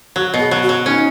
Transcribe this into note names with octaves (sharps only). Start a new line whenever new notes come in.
F#3 F#4
B2
G#4
F#3
F#4
F#3
C#4 D#4